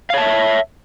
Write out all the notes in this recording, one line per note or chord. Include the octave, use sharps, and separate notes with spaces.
C#5 E5 F5 A5